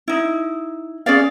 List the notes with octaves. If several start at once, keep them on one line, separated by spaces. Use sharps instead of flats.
D#4 E4
C#4 G#4 D5 F5